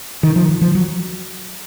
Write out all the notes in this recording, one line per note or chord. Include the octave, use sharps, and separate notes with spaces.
D#3
F3
D#3
F3
F#3